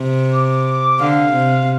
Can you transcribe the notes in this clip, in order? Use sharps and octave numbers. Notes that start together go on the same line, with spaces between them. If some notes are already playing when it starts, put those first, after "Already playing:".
Already playing: C3
D6
D3 F5
C3